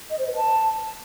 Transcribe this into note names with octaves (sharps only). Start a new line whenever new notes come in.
D#5
C5
B4
A5